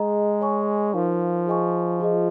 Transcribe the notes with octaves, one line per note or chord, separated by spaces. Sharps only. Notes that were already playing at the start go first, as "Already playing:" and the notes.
Already playing: G#3 G#4 D#5 A#5
C#5 G#5 C#6
F3 D#4 A#4 F5
G#4 D#5 G#5 C#6
F4 G#4 D#5